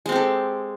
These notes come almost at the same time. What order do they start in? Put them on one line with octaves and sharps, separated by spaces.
G#3 C4 G4 A4